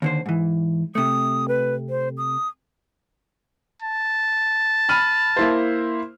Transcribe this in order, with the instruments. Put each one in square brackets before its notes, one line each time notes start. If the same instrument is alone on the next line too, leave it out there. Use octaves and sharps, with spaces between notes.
[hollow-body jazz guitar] D#2 D3 C5
G#2 E3
[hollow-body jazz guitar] C3 A3 [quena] D#6
[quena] B4
C5
D#6
[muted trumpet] A5
[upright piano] B5 F6 D#7
A#3 E4 C5